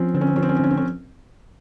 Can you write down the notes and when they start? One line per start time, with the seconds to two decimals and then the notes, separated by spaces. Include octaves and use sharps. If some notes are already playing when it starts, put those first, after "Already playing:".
Already playing: F3 C4 C#4
0.15 D3 C4
0.21 C#4
0.28 C4
0.36 F3 C#4
0.42 C4
0.49 C#4
0.56 C4
0.60 D3 C#4
0.71 C4
0.77 C#4